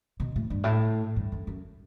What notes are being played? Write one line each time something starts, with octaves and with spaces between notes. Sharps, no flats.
B2
A2
G2
A2
G2
F#2
F#2